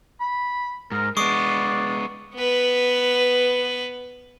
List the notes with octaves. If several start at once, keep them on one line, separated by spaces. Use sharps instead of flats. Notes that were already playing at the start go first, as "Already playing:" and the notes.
B5
G#2 A#4
G#3 B3 D4 C#6 D#6 C7
B3 B4